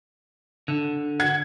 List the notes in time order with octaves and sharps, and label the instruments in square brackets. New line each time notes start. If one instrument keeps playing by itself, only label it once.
[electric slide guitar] D3
[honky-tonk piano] F#5 G#6